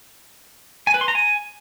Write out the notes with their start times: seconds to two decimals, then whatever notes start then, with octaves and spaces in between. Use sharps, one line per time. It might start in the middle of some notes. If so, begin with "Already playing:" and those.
0.87 G#5
0.94 B4
1.01 C6
1.08 A#5
1.15 G#5